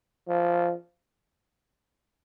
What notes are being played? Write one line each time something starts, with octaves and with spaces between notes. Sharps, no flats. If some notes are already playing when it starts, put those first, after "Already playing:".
F3